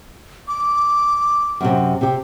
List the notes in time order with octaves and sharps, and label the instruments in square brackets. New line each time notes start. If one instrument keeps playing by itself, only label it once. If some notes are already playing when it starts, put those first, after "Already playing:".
[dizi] D6
[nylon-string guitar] F#2 A2 C3
C3 G4